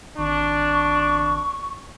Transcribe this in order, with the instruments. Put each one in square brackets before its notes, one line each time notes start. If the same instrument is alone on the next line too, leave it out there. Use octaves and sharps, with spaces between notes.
[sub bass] G#1 [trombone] D4 [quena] C#6